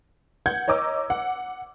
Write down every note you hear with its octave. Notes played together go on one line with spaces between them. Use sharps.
F#5 G6 G#6
C#5 D#5 A#5 D6 E6
F#5